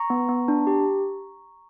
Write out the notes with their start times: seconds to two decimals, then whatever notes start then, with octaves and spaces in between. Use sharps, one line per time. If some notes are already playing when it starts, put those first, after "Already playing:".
Already playing: A#5 C#6
0.10 B3
0.29 B3
0.48 D4
0.67 G4